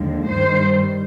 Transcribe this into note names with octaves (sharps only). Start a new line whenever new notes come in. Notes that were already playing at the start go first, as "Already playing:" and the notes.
Already playing: D#2 D3 F3 G#3
G2 D#3 G3 C5